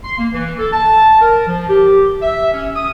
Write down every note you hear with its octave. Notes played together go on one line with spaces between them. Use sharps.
C6
A#3
E3
A4
A5
A#4
F3
G4
E5
C#4
D#6